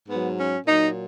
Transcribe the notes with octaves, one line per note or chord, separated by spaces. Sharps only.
G#2 F#3 B3
C#4
A#2 F#3 D#4